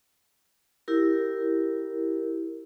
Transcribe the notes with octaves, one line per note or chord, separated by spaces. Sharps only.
E4 G4 A#4